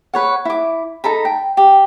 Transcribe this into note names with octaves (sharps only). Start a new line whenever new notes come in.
B4 C#5 F#5
E4 D6
D#4 A4 A#5 B5
G5
G4